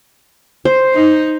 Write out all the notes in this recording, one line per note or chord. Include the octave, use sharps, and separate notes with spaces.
C5
D#4